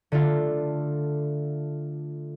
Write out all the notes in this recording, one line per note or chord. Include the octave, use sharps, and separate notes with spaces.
D3 A3 F4